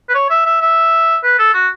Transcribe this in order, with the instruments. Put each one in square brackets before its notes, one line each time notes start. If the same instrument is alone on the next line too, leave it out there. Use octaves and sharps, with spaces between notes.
[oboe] B4
C#5
E5
E5
E5
B4
A4
F#4